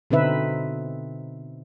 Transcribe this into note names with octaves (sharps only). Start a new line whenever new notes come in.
B2 D3 C4 D#4 B4 E5